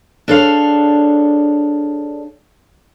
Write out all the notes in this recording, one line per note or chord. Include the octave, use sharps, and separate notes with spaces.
D4 G#4 A4 C#5 D5 F5